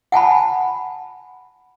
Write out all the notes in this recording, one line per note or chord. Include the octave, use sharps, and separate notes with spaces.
F#5 G#5 A5 B5